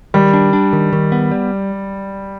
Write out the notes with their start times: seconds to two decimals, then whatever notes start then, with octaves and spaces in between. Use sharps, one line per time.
0.14 D#3 G3
0.33 D4
0.53 D4
0.73 D#3
0.93 D#3
1.12 B3
1.32 G3